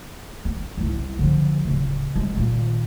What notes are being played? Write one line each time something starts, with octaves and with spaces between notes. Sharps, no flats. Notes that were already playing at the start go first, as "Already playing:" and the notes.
B3
C2 E4
D3 F3
D1 C#3
C2 G#3
A#2 D#3